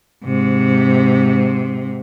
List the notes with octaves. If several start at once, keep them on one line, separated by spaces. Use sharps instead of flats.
G#2 C3